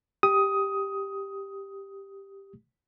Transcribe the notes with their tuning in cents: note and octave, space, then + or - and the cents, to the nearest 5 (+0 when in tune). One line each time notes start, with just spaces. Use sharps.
G4 +5 D#6 +10